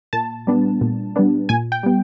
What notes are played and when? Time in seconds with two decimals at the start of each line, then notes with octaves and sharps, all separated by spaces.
0.13 A#2 A5
0.47 G3 B3 D4
0.81 A#2
1.16 G3 B3 D4
1.49 A#2 G#5
1.72 G5
1.83 G3 B3